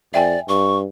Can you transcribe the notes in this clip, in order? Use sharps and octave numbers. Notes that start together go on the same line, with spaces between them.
F2 D5 E5 G5 G#5
G2 C#6